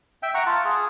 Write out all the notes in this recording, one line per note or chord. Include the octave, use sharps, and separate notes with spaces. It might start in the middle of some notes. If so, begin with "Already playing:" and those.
E5 G5
F#5 A#5 C#6
F4 A5
G#4